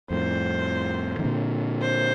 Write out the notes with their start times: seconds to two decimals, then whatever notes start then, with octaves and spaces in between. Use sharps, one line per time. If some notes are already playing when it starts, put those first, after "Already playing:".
0.11 F2 A2 C5
1.19 E3
1.24 A#2 D3
1.81 C5